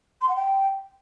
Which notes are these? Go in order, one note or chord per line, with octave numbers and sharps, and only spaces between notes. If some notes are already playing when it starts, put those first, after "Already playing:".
C6
F#5
G5